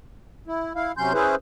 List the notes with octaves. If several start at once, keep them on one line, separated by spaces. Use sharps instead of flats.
E4
E4 F5
C3 F#3 C#4 C6 G6
C#4 E4 G#4 B4 C5